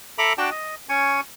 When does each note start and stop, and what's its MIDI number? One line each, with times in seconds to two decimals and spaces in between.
0.18 0.33 69
0.18 0.33 76
0.18 0.33 82
0.18 0.33 83
0.18 0.33 86
0.38 0.50 62
0.38 0.50 66
0.38 0.50 74
0.38 0.50 79
0.38 0.50 81
0.51 0.75 75
0.89 1.21 61
0.89 1.21 80
0.89 1.21 85